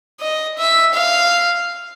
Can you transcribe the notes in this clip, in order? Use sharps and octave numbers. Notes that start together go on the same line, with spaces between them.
D#5
E5
F5